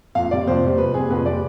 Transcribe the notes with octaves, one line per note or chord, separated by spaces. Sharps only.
F2 F5
C3 G3 D5
F2 C5
C3 G3
F2 B4
C3 G3 G#4
F2 B4
C3 G3 D5